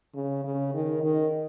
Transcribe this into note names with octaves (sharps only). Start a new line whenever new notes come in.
C#3
C#3
D#3
D#3